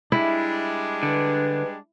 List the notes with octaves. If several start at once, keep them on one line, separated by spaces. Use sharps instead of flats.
G3 G#3 D4 E4
D3 B4